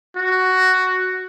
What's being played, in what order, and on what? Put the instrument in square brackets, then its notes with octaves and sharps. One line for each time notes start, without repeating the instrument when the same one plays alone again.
[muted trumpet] F#4